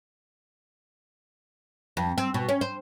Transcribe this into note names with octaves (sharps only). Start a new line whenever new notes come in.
F2
C4
B2
C#4
C5